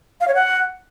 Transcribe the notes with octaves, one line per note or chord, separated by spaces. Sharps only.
F5
C#5
F#5